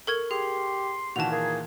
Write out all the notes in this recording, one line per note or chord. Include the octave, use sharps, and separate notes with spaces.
A4 A#4 C#6 G#6
G4 G#4 C6
A#2 D#3 E3 F#4 A5 F7
A#3 G#4